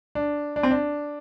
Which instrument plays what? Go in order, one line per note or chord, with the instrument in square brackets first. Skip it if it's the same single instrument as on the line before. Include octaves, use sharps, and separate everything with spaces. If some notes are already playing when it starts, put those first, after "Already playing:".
[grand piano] D4
D4
C4
D4